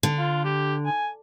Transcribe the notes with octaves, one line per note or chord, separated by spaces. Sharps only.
D3
F4
G4
G#5